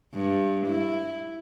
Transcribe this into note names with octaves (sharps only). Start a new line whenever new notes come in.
G2
E4